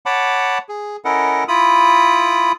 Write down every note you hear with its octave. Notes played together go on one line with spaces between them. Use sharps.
C#5 F#5 A5 B5 D6
G#4
C#4 E4 A4 A#4 D#5 F#5
E4 F4 B5 D#6